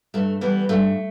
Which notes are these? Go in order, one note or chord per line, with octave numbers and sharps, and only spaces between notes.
G2 A3
E3 G3 B3
G2 A3